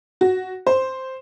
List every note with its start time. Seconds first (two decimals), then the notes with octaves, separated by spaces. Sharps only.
0.21 F#4
0.67 C5